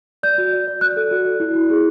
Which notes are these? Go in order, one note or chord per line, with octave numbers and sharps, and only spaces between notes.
D5 G6
F#4
D5
D5
D5 F#6
A4
F#4
D5
E4
E4
G#4